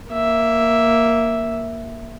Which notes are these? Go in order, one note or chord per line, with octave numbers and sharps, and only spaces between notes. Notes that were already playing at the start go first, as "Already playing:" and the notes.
A#3 E5